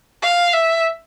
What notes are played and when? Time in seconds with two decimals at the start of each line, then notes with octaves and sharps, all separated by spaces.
0.23 F5
0.53 E5